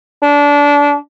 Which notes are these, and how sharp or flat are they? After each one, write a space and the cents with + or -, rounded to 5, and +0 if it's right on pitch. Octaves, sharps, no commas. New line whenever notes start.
D4 -25